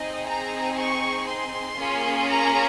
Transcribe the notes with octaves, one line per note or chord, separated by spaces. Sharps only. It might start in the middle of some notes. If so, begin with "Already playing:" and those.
Already playing: C4 D#4 G#4 D#5
A#5
C#6
C6
A#3 C#4 F4 G#4
A#5